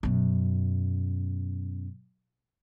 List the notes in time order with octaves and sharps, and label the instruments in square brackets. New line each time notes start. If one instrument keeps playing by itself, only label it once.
[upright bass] F#2 B2